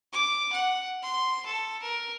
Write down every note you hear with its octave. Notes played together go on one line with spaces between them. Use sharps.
D6
F#5
C6
A4
A#4